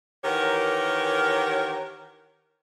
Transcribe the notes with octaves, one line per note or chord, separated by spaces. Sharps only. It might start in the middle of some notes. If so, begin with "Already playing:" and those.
D#3 E3 G4 A#4 C#5 F#5